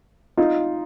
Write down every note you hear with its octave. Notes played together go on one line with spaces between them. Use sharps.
D#4 F4